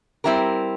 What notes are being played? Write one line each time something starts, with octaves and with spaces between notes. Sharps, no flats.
G3 C4 E4 G4 A#4